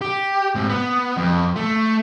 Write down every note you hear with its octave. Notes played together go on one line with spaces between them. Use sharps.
G4
G#2 C4
B3
F2
A3